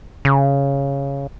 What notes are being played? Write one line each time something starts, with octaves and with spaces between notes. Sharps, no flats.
C#3